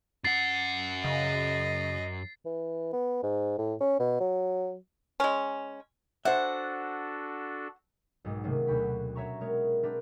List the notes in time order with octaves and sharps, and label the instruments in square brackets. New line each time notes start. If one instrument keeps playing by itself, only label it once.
[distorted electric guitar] F#2 F#5 [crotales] A6 C7
[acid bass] C#3 [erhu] D#5
[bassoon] E3
B3
G#2
A2
C#4
B2
F#3
[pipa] G#3 C#4
[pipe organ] D4 F#4 A4 [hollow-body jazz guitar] C5 E5 [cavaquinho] F#5
[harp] B1 G#2 B2 G#3
C3 D#3 F#3 A3 A#3 C#4
D2 B2 F#4 G5 B5
C#4 C#5 E5 A#5 C#6
G#3 B3 A#4 C#5
C4 D4 A#4 B4